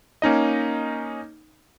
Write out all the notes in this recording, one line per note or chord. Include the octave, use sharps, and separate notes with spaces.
A#3 C#4 D#4 D#5